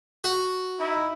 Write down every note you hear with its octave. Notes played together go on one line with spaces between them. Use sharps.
F#4
D#4 E4